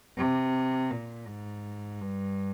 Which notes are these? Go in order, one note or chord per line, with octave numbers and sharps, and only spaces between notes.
C3
A#2
G#2
G2